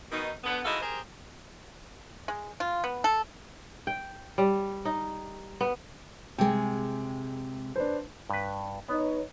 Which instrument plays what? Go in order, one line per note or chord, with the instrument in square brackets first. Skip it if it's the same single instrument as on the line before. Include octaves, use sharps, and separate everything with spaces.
[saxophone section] B2 D#3 D#4
D3 B3
G#2 E4 F#4 A4 D#5 F5
G4 G#4 A#4 C5
[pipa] G#3
F4
B3
A4
[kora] G5
G3
D#4
B3
[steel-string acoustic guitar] C3 G#3 [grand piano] G5 G#5
[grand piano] D4 B4 C5
[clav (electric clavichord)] G2 B4
[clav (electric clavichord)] B3 [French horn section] D#4 B4 C#5